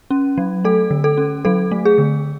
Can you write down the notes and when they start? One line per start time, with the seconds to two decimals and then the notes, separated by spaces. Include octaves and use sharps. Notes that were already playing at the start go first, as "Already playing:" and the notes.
0.11 C#4
0.38 F#3
0.65 A3 A4
0.91 D3
1.04 A4
1.17 C#4
1.45 F#3 A4
1.71 A3
1.85 G#4
1.98 D3